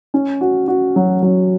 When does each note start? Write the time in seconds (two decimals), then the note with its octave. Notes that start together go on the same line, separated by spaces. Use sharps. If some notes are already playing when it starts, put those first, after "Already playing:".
0.14 C#4
0.41 F#4
0.68 F#4
0.96 F#3
1.22 F#3